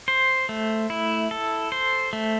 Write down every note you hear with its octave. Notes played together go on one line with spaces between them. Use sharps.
C5
A3
E4
A4
C5
A3